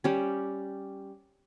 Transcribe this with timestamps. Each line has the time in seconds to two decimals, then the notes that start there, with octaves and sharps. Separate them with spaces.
0.04 G3 C#4 G4